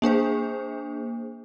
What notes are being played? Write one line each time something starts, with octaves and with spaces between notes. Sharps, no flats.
A#3 D4 G#4 C5